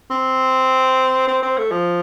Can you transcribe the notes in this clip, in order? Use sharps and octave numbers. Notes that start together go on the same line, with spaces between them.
C4
C4
C4
A3
F3